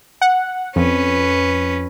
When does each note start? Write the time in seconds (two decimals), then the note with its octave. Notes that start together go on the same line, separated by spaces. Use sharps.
0.21 F#5
0.76 F2 C#4 B4